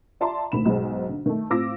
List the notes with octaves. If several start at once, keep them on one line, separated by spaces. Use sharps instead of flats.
F4 D5 E5 A5 A#5 C6
D2 A2 D#3 B5 E7
B1 G#2 D#4 G#4 C5
D3
D#3 A3
A2 C4 F4 D6 E6 A#6